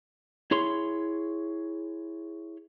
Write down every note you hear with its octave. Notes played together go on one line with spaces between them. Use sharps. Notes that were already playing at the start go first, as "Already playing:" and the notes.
E4 G#4 C#5 C6